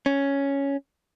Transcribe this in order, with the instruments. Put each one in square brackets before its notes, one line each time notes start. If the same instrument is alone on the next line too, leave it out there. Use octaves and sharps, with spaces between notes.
[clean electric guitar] C#4